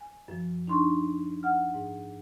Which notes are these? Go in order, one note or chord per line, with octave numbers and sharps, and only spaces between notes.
G#5
F#2 F3
D4 D#4 C6 C#6
F#5 F6
G#2